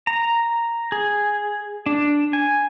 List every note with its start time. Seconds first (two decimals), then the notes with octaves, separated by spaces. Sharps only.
0.07 A#5
0.92 G#4
1.86 D4
2.33 G#5